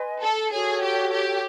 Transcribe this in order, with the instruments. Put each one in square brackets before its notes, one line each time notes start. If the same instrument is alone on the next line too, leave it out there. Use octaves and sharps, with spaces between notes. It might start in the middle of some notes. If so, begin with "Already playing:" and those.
Already playing: [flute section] B4 D#5 G#5 C6
[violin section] A4
[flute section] F#4 A4 C#5 [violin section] G#4
[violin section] G4
G4